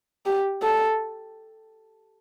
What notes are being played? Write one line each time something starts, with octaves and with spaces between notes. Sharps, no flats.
G4
A4